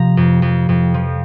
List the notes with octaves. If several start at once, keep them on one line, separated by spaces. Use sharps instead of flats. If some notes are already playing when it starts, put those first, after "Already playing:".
Already playing: C3 F3 A#5
F2
F2
F2
F3